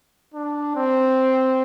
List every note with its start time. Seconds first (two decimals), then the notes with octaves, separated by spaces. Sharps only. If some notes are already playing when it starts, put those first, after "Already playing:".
0.34 D4
0.76 C4